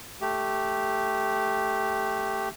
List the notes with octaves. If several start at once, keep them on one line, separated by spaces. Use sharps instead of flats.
A3 G4